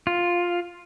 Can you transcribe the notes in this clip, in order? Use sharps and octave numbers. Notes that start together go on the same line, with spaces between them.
F4